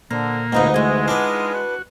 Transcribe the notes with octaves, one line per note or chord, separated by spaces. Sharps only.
A#2 D3 A#3 C5
D2 G#2 C4 D#4 F4 B4
E3 G#3 A3 D#4 G#4
B3 D4 D#4 F4 B4 D5
F#4